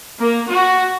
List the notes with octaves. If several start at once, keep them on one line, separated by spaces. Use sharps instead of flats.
A#3
F#4